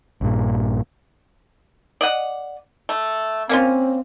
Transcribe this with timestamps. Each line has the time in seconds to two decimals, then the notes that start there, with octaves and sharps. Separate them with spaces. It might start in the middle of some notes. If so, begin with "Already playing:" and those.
0.21 A#1 G2 A#2
2.01 D5 D#5 F#5
2.89 A3
3.49 A#3 C4 C#4 F4